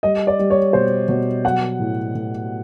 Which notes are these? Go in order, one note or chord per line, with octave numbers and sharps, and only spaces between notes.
G3 D#5
D5
G3
C#5
B2 C5
B2 C#5
F#3 F#5
A2
A2